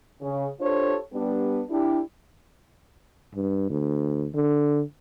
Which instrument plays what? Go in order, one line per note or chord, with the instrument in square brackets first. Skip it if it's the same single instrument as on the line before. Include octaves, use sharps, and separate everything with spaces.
[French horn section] C#3
D4 F4 G4 A4 C5 C#5
G3 B3 D4
D4 E4 G4
[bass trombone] G2
D2
D3